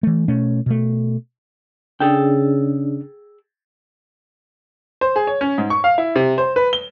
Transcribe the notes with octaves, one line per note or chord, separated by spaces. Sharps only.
E3 A3
B2 A3 C#4
B2 A3
C#3 D4 G#4 A4 G5
C5
G#4
C#5
C#4
G#2
C#6
F5
E4
C3
C5
B4
G7